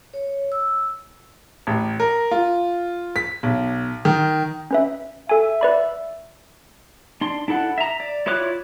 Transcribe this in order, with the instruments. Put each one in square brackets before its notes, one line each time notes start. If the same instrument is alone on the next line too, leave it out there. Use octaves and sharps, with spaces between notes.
[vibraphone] C#5
E6
[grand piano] A1
A#4
F4
B6
B1
D#3
[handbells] C#4 B4 E5
[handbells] A4 G#5 [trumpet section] E5
[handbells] B4 D5 B5
[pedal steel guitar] D4 C6
D4 E4 A4 F#5
E5 A#5
D5
E4 F4 C#5 D6 F#6